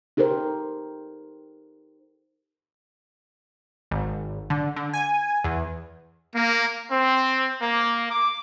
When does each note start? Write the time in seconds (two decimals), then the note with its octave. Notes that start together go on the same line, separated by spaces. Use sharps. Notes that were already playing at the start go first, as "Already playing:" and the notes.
0.17 D#4 G4 A4 A#4 C5
3.91 G#1
4.50 D3
4.76 D3
4.93 G#5
5.44 E2
6.34 A#3
6.90 C4
7.60 A#3
8.10 D6